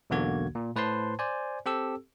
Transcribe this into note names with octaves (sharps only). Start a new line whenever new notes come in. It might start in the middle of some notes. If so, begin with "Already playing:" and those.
B1 E2 D3 A#3 F#4 G#6
A#2
A2 B4 C5 A5 C6
C5 D5 G#5
C4 G4 A4 E6